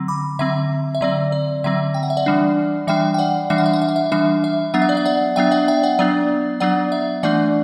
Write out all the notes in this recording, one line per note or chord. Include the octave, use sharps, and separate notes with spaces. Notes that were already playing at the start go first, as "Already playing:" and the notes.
Already playing: D3 F#3 C4
B5 D6
D3 F#3 C4 E5
E5
D3 F#3 C4 D5
D5
D3 F#3 C4 E5
G5
F#5
E5
D5 F#5
E3 G3 D4
E3 G3 D4 E5 G5
G5
D5 F#5
E3 G3 D4 E5
F#5
E5
F#5
E5
F#5
E5
E3 G3 D4 E5
E5
F#3 B3 D4 F#5
E5
D5
E5
D5 F#5
F#3 B3 D4 E5 G5
D5 F#5
E5 G5
D5 F#5
F#3 B3 D4 D5
F#3 B3 D4 D5 F#5
E5
E3 A3 D4 D5 F#5